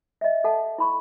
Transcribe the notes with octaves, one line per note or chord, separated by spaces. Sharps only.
D#5 E5
A4 E5 F#5 A5
E4 B5 C#6